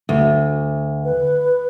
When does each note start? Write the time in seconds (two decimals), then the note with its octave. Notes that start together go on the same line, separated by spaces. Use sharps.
0.09 D2
1.04 B4